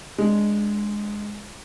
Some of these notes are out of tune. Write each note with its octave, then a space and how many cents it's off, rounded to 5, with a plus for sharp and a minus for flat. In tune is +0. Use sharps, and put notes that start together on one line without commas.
G#3 +0 D4 +0